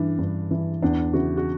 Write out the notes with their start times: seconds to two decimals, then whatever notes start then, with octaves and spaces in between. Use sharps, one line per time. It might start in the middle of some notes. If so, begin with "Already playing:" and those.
Already playing: G2 E3 D4
0.19 G2
0.51 E3
0.83 E2 D4
1.13 C#3 E3 F#4
1.37 F#4